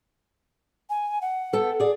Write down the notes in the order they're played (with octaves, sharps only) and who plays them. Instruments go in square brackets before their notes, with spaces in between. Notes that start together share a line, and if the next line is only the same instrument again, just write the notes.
[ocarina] G#5
F#5
[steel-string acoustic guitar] B3 A4 G5
G#4 D5